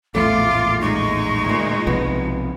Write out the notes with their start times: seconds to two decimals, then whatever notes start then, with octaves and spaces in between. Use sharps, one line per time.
0.15 A#1 E2 A2 A3 F4 D6
0.81 G#3 D#4 C#6
1.45 D2 A#2
1.87 B1 C3 F3 B3